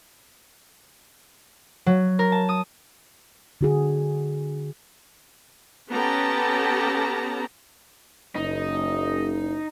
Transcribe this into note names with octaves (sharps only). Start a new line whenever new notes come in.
F#3
A#4
A5
D#6
D3 F#4 G#4
B3 C#4 G4 A4 A5 A#5
F#1 D#4